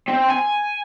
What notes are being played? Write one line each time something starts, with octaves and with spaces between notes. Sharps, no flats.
C4
G#5